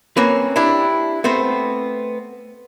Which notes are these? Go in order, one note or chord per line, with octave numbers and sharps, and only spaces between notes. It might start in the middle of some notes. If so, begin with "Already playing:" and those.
A#3 C4 C#4 B4
D4 E4 G4
A3 B3 C4 C5